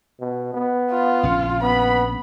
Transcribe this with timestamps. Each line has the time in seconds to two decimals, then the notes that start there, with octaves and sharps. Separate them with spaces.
0.20 B2
0.54 B3
0.90 F4
1.23 A#1 C#3 C#4
1.62 B3 B5